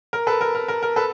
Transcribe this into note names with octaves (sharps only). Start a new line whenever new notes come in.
A#4
A4 B4
A#4
A#4
A#4
A#4
A4 B4